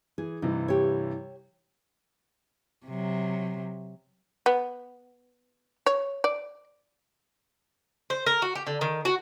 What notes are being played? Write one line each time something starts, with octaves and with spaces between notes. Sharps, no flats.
E3 G#4
G2 C3 E3 D#4
G4 C#5
C3 F#3
B3
C#5
D5
C5
A#4
F#4
G4
D3
D#3
F#4